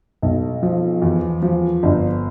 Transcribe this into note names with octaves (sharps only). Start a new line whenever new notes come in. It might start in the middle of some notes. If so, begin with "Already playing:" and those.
B1
F3
E2
F3
G1